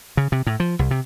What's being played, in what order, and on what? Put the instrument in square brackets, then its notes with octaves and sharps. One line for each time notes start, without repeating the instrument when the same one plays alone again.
[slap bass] C#3
C3
A2
F3
C2
C3